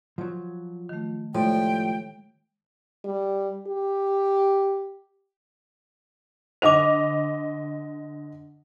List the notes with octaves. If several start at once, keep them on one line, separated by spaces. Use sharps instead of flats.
F3 F#3
D#3 A3
A2 F3 G3 G#3 G5
G3
G4
D3 C5 D#5 D6 F7